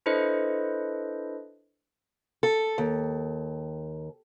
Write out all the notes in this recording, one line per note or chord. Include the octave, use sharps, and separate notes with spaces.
D4 E4 A4 B4 C5 D#5
A4
D#2